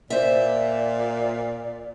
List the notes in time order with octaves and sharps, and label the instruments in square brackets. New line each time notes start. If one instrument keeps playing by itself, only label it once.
[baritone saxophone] A#2 [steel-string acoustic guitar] C5 E5 [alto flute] D5